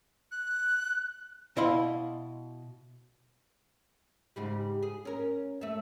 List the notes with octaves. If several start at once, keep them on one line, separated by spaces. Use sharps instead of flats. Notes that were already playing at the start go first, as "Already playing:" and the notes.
F#6
B2 E4 D#5 F5 B5 C6
G#2 C#3 G3
G#4
C#4 A#4
A3 E5